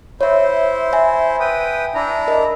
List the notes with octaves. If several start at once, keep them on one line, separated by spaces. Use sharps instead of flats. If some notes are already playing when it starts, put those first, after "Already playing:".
E4 C5 C#5 E5
E5 G#5
B4 G5 D#6
D4 E4 A#5
A#4 D#5